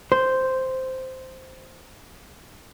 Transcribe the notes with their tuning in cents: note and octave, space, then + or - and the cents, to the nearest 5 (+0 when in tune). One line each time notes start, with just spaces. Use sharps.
C5 -5